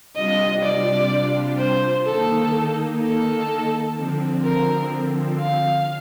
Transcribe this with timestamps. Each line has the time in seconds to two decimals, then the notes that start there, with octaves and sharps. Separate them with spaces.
0.15 C3 G3 D4 F4 D#5
0.63 D5
1.58 C5
2.05 D#3 A#3 D#4 A4
3.01 A4
3.96 D3 F3 C4
4.44 A#4
5.40 F5